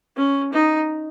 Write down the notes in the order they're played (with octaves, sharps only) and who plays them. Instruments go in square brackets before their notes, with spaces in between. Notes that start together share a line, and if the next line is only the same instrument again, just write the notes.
[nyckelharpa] C#4
D#4